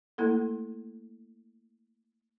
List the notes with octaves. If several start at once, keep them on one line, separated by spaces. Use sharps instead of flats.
A3 A#3 E4 A4